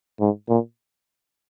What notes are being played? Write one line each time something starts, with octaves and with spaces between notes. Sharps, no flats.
G#2
A#2